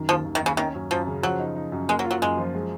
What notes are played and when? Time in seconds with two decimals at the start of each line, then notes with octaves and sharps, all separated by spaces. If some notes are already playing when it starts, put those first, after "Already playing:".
Already playing: F#2 D#3
0.08 D#2 F3
0.24 D#2
0.35 D#3
0.42 D#2 C#3
0.57 D#3 C#4
0.74 F#2
0.91 F#2 F3
1.07 C#3
1.23 F3 F#3
1.40 D#4
1.56 D#4
1.72 F#2
1.89 G#3 A#3
1.99 F#3
2.05 F4
2.11 F#3
2.22 F#2 G#3
2.37 F3
2.54 G#3